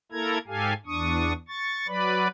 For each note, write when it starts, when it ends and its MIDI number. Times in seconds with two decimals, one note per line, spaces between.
0.12 0.38 58
0.12 0.38 64
0.12 0.38 69
0.12 0.38 70
0.12 0.38 82
0.12 0.38 92
0.47 0.74 44
0.47 0.74 67
0.47 0.74 69
0.47 0.74 77
0.47 0.74 80
0.86 1.33 40
0.86 1.33 62
0.86 1.33 85
0.86 1.33 87
1.48 1.87 85
1.48 1.87 93
1.88 2.28 54
1.88 2.28 71
1.88 2.28 74
1.88 2.28 83